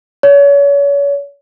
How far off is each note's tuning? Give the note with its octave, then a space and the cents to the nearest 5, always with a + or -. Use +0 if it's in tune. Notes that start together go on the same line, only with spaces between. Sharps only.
C#5 +35